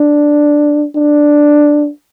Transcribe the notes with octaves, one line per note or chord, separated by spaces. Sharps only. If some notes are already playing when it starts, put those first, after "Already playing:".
Already playing: D4
D4